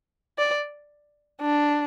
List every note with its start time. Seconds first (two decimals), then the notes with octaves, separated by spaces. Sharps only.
0.38 D5
1.42 D4